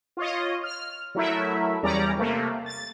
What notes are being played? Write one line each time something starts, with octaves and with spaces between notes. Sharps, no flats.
F4 C#5 D#5
F6
F#3 A3 E4 A#4 E5
E2 G3 C#4 D5 A#5
C3 A3 A#3
A6